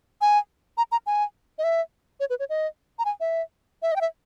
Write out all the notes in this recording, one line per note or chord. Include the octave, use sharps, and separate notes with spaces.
G#5
A#5
A#5
G#5
D#5
E5
C#5
B4
C#5
D#5
A#5
G#5
E5
E5
D#5
G5
E5